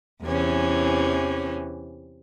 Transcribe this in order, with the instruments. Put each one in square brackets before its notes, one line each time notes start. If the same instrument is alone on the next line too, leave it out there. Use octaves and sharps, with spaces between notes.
[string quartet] E2 C3 E3 C#4